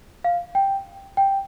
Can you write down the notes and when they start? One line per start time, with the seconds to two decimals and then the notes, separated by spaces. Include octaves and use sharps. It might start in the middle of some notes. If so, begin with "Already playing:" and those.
0.24 F5
0.55 G5
1.17 G5